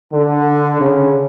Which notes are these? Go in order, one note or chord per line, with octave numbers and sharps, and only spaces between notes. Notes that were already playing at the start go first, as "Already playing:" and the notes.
D3
C#3